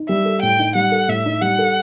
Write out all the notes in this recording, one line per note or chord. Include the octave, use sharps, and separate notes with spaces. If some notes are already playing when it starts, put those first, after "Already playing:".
Already playing: D#4
G3 E5
A4
A2 G5
D#4
G3 F#5
A4
A2 E5
D#4
G3 F#5
A4